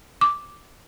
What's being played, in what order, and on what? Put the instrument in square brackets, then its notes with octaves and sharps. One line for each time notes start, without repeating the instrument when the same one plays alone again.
[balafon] D6